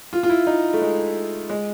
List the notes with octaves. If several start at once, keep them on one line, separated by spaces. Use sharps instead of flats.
F4
F4
E4
D#4
A3
G#3
G#3